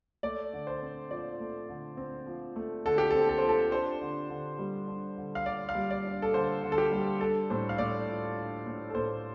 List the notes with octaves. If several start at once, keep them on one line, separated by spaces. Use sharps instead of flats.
A3 D5
D3
C5
C4
F3 D5
A3
D3
C4
F3
A3
D3 A4
G4
C4 A4
A4
F3 C5
A4
D4 C5
D3
D3
G3
D4
D3
F5
D3 D5
F5
G3
D5
D4
A4
D3 C5
D3
A4
G4
G3
D4 A4
A2 C5
F5
A2 D5
F3
D4
A2
A4
A2 C5